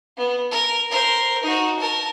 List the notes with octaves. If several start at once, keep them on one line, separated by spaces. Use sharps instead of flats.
B3
A#4
A#4 C5
D#4 F#4
A#4 A5